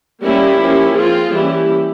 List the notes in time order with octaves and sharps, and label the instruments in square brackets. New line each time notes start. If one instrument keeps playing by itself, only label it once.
[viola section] G3 A#3 C#4 E4 G4
F3 A#3 C#4
F3 C4 F4 G#4
E3 G3 A#3 C#4 E4 G4